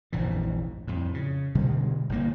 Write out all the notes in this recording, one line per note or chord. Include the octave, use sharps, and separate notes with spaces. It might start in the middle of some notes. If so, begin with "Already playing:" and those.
F1 A#1 G2 E3
F2 A2
C#3
B2 D3 G3 G#3
G1 A2 C3 A#3